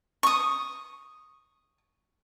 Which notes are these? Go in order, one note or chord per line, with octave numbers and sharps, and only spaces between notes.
C#6 D#6